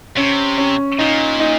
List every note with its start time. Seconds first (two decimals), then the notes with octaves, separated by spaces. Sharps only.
0.17 C3 C#4
0.58 C#4
0.98 A#2 D#4
1.40 D#4